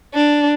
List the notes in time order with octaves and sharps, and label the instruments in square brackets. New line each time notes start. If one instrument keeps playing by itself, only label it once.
[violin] D4